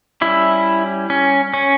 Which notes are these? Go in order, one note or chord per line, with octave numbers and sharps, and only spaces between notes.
G3 C#4 E4
C#4
C#4